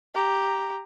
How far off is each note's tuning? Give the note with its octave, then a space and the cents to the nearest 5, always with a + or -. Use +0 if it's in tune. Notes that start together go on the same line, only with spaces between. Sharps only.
G4 +0 A#5 +0